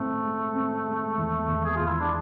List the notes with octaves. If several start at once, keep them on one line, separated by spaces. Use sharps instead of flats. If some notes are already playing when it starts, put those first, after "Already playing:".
Already playing: A2 G#3 A3 C4
G#3
C4
G#3
E2
E2
G#4
E2 F4
E4
D4